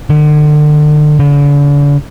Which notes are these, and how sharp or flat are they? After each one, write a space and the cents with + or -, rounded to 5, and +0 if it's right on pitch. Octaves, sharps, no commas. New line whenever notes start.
D3 +35
D3 -40